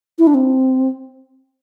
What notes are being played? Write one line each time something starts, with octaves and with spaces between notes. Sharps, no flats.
E4
D4
C4